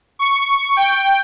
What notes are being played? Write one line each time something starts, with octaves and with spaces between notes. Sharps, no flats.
C#6
G5